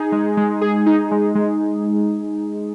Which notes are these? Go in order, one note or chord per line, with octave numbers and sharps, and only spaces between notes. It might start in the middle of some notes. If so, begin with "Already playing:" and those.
Already playing: D#4 G#4
G#3
G#3
G#4
D#4
G#3
G#3